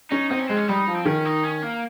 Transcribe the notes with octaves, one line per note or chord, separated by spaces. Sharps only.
C#4 D#4
C4 D#4
C#4
G#3 C4
C#4
G3 D#4
F3
C4
D#3 C#4
D#4
C#4
A#3